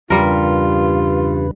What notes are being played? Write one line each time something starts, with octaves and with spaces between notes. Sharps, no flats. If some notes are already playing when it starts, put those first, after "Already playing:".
E2 G2 C#3 G3 F4 A#4 B4